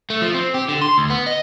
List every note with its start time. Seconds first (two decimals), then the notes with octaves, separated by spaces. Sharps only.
0.10 A3
0.21 F3
0.34 C4
0.54 G4
0.69 D3
0.82 C6
0.98 D2
1.10 B3
1.27 D#5